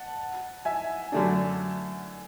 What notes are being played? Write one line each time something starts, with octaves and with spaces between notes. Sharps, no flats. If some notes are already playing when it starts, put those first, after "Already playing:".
Already playing: F#5 A5
E5 G#5
F#2 D3 A3 D4